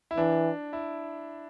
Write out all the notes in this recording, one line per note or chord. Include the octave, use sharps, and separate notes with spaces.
E4
E3 D4
E4